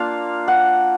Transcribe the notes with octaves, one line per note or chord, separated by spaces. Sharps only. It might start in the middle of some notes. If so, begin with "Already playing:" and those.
Already playing: A#3 D4 F4 F5
F#5